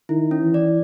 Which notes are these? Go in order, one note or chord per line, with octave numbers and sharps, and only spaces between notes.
D#3 E4
C#4
E3
D5